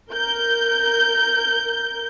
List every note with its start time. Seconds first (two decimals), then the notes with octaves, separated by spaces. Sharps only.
0.11 A#4 G6